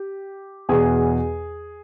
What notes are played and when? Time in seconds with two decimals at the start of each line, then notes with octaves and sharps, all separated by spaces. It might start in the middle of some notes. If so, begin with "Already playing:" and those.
Already playing: G4
0.69 E2 B2 G#4